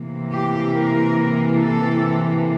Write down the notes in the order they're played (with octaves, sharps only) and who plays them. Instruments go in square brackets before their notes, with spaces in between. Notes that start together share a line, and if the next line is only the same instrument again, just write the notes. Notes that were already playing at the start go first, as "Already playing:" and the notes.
Already playing: [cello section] C3 E3 A#3
G4
A#4
A4